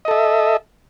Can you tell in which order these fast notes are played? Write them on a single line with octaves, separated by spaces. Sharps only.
D#5 A4 E5